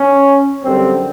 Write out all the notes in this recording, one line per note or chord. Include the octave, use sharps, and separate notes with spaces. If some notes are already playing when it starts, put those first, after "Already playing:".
Already playing: C#4
F#2 D3 G3 C4